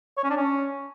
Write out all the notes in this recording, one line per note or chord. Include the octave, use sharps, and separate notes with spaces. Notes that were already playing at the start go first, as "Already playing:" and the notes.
C#5
C#4
D4
C#4